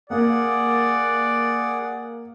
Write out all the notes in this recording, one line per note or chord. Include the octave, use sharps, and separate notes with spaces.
A#3 G#4 D5 F#5